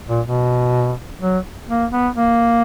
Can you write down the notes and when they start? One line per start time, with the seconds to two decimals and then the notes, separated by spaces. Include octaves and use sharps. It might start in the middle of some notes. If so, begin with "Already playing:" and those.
0.09 A#2
0.26 B2
1.21 F#3
1.69 A#3
1.92 B3
2.16 A#3